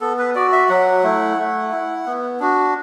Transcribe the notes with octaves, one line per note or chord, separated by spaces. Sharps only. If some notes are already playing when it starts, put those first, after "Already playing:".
B3 A4
B4
F#4 D5
E5
F#3 F#5
A3 E4
A3
E4
B3
D4 F#4